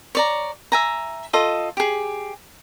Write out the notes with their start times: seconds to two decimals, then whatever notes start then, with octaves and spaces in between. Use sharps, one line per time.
0.15 C#5 D5 A#5
0.72 E5 G#5 A#5
1.33 F4 A4 D#5
1.77 G4 G#4